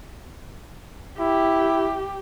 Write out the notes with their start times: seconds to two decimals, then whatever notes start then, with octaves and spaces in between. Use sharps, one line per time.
1.19 E4 G4